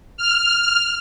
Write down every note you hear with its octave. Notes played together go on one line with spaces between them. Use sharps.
F6